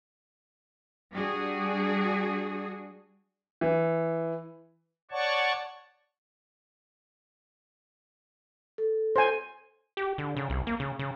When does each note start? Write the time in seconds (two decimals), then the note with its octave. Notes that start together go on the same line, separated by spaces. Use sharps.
1.13 G3 D4 F#4 G#4
3.61 E3
5.11 C#5 D5 F#5 A5 C#6
8.78 A4
9.16 C5 G#5
9.97 G4
10.18 D3
10.37 C#3
10.50 C2
10.67 A#3
10.80 C#3
10.99 C#3